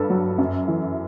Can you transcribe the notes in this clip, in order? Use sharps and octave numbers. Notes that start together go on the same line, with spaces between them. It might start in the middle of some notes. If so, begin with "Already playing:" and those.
Already playing: G2 A4 B4
F#3
F#2
E3